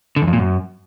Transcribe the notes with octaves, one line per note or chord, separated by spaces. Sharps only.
D3
E2
F2
A#2
F#2